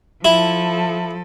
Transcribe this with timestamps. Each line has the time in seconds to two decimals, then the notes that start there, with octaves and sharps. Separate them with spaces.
0.25 F3 E4 A4